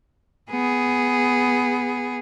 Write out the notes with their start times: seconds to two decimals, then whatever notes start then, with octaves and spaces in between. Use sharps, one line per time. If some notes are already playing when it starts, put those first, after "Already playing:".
0.50 B3 G#4